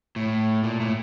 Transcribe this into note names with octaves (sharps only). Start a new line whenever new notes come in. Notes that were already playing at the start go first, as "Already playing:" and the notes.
A2
A#2
A2